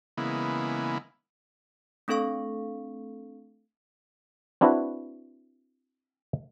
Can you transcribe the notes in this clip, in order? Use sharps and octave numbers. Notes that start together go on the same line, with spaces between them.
C#3 E3 G#3 A#3 B3 E4
A3 C4 D4 A4 F5 C#6
C4 D4 E4 F#4 B4